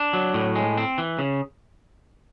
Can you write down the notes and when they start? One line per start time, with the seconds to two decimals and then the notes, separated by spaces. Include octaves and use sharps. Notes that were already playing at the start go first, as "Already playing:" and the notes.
Already playing: D4
0.13 F#3
0.34 A2
0.55 G#3
0.77 C4
0.98 E3
1.19 C#3